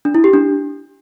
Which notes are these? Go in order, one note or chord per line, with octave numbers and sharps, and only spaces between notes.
D4
E4
G4
D4